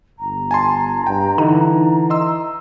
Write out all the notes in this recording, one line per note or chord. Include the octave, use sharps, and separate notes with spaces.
G1 A#5
G#5 A5 C6
G2 G5
D3 E3 D#4
D#5 C6 E6